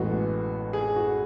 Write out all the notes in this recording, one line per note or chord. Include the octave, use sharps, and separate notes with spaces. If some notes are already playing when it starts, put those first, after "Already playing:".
Already playing: A1 A2 G#3 B3 F#4
G#4
F#4